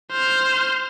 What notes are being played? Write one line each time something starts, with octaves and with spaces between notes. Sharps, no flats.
C5 F6